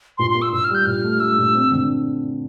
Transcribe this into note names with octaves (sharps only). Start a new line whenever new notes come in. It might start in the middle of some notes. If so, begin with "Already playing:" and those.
A#2 C6
A#3 C6
E6
A#2 E6
F6
G3
G6
A#2 F6
A3
A3 E6
A#2
C4
D3